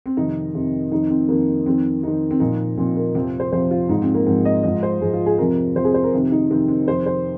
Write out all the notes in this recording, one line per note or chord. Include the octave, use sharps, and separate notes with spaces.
C4
F2 C3 D#3 D#4
F2 C3 D#3
F2 D#3 D#4
C4
F2 D#3 A#3
F2 D#3 C4
F2 D#3 D#4
C4
A#2 F3 D#4
A#2 F3 C4
A#3
F2 C3 F3 C4
C5
F2 C3 F3 C5
F4
G#2 F3 D#4
C4
A#3
G#2 F3 C4
D#5
G#2 F3 D#5
C5
G#2 F3 G#4
F4
G#4
F2 C3 F3 A#4
F2 C3 F3 C5
G#4
C5
A#4
F2 C3 D#3
D#4
F2 C3 D#3 C4
C4
F2 C3 D#3 C5
C5